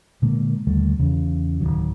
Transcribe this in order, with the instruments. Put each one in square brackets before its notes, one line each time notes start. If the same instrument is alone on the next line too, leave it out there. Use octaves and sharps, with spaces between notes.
[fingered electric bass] A#2 D3 G#3 A#3
D#2 D3 G3 A3
E2 C#3 E3
D1 C2 D#3 F#3